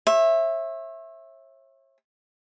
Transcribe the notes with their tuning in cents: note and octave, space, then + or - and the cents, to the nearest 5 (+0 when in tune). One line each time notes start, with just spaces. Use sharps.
C#5 -40 E5 +0